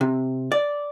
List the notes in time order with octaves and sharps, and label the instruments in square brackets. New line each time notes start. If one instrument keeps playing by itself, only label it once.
[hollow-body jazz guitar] C3
D5